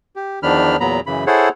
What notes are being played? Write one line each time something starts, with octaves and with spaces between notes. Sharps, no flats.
G4
E2 D#3 F3 D4 B5 F6
E2 A#2 F#3 B3 A#5 B5
F#2 C#3 E3 B5
E4 G#4 A4 C5 C#5 F#5